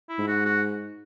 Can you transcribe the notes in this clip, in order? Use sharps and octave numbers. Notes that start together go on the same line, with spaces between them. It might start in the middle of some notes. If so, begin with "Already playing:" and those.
E4
G#2
F#4
F#4